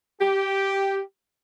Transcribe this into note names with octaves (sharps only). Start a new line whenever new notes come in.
G4